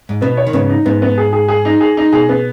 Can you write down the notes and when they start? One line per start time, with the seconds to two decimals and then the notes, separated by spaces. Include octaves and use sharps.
0.09 G#2
0.21 B2 B3
0.37 C#5
0.47 D#3
0.53 G#2 C#3 B3
0.69 D#4
0.86 G#2 B3
1.02 B3
1.18 G#4
1.33 G#4
1.48 G#4
1.65 D#4
1.81 G#4
1.97 D#4
2.12 B2 G#4
2.29 B3